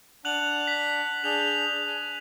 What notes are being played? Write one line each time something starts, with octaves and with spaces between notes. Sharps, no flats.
D4 F#5 F#6 F7 F#7
B6
D4 G#4 G6 F7
G#5